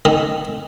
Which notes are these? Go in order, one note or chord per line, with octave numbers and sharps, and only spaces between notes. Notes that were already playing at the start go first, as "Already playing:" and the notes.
D#3